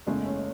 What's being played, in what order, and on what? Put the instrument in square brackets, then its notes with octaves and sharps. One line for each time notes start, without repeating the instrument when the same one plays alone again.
[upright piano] F#1 E2 C#3 G#3 [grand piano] A3
[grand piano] C#4